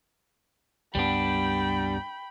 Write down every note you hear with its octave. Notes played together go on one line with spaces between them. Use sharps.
C#2 G2 G3 B3 D4 G5 B5